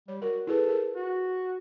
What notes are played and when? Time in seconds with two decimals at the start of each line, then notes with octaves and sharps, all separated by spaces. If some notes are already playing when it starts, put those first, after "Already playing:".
0.08 G3 C#5
0.22 F#4 A#4
0.47 E4 G#4 A4 B4
0.68 G#4 A#4
0.96 F#4